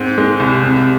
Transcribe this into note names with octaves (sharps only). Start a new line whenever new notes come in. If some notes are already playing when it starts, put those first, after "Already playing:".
Already playing: G#2 C4
G#3
C2
C3